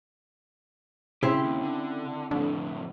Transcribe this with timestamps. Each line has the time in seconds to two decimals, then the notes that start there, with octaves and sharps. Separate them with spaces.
1.23 C#3 C4 E4 G4
1.43 D#2
1.62 D3
2.31 F2 A2 D3